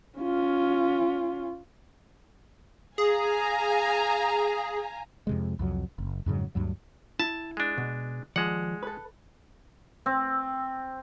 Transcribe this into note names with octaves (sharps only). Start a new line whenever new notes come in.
C#4 F4
G#4 F5 G#5 A#5
F2 C3 G#3
C2 F2 F#3
F#1
F2 G#2 C#3 F#3
D2 G2 F#3
E4 A5
G#3 D4
B2
D#2 F3 G#3 D5 F#5
A4 B4
C4